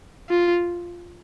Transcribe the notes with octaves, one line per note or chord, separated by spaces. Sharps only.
F4